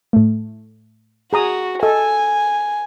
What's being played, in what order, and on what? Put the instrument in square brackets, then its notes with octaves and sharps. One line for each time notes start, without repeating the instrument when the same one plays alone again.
[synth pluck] A2 A3
[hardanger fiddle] F#4 [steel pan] G#4 A#5 D#6
[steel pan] A4 [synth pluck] D#5 [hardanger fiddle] G#5